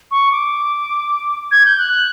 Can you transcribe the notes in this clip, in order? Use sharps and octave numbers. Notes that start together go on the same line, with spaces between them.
C#6
D6
G#6
G6
F#6